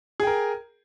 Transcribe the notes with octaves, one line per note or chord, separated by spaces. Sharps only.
G#4 A#4 G5